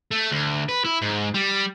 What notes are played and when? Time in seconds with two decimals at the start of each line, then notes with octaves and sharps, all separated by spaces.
0.11 A3
0.32 D2
0.69 B4
0.85 E4
1.02 G#2
1.34 G3